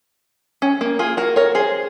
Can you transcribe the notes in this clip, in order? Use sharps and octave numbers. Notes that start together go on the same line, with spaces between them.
C#4
A#3
F4 G#4
F#4 A#4
A#4 C#5
G#4 C5